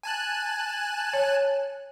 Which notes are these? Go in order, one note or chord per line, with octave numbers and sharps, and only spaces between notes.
G#5 A5 F#6
C#5